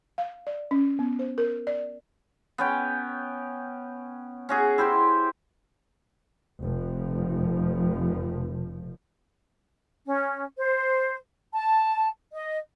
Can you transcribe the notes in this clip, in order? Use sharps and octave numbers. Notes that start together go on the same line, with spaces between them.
F5
D5
C#4
B3
C5
A#4
D5
B3 C#4 G5
C#4 F#4 G#4
E4 G4 C5 C6
F1 F3
C#4
C5
A5
D#5